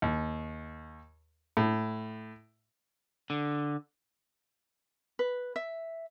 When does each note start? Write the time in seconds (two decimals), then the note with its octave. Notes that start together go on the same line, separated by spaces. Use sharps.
0.02 D#2
1.57 A2
3.30 D3
5.19 B4
5.56 E5